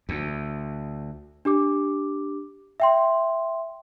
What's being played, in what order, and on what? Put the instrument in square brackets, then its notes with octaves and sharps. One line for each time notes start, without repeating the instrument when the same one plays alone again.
[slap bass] D2
[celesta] D4 G4 D6
E5 G5 C6